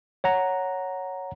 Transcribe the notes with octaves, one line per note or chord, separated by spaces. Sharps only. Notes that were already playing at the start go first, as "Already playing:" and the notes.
C#5 F#5 A#5